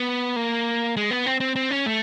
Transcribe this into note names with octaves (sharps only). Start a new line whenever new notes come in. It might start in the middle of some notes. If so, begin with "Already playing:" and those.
Already playing: B3
A#3
G#3
B3
C4
C4
C4
C#4
A3